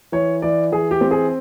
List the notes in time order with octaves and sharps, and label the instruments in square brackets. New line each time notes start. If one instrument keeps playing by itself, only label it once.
[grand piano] E3 C#5
E3 D5
E3 G#4
G4
C4
G#4